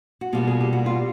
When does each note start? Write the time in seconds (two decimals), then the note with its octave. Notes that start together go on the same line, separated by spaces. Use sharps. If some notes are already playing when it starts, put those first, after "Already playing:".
0.21 F#4
0.33 B2 G3 A#3 F4
0.47 G#4
0.61 G4
0.73 F#4
0.86 F4